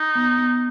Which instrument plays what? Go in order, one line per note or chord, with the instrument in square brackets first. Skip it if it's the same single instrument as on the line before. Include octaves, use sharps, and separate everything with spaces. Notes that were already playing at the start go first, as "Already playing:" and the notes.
Already playing: [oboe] D#4
[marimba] B3
B3